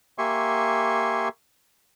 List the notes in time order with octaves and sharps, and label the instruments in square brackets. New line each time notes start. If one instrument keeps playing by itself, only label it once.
[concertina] A#3 G4 E5 G#5 C6 C#6